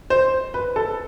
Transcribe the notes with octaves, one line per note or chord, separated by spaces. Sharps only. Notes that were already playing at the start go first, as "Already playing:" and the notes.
C5
B4
A4